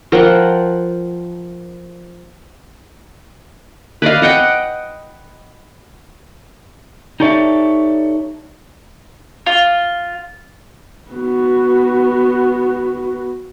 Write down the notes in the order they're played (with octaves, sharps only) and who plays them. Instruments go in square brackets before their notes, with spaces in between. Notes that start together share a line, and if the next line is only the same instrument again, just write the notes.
[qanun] F3 A#4 F#5 G5
B4 D5 D#5 F5
D#5 F#5 G5
[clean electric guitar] D#4 G4 A4 C#5 D5 E5
[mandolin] F4
[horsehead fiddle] B3 F#4